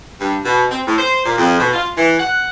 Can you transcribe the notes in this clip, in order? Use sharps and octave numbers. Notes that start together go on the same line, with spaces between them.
G2
B2
C4
A2
C5
A#2
F2
B2
F4
E3
F#5